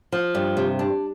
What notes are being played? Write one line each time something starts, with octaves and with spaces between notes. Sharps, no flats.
F3
G2
C3
D4